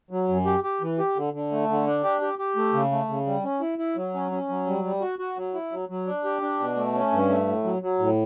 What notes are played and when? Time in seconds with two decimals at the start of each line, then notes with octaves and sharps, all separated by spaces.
0.11 F#3
0.29 F#2
0.46 G4
0.64 G4
0.81 E3
0.99 G4
1.16 D3
1.33 D3
1.52 A3
1.69 D3
1.87 D4
2.04 G4
2.21 G4
2.39 G4
2.56 A3
2.74 C#3
2.91 A3
3.09 C#3
3.26 G3
3.44 C#4
3.61 E4
3.79 E4
3.96 F#3
4.14 C#4
4.31 C#4
4.49 F#3
4.66 G3
4.84 G3
5.01 F#4
5.19 F#4
5.37 F#3
5.54 E4
5.72 F#3
5.89 F#3
6.06 D4
6.24 G4
6.42 D4
6.60 B2
6.76 A3
6.94 C#4
7.12 G2
7.29 A3
7.47 A2
7.64 F#3
7.82 F#3
7.99 A2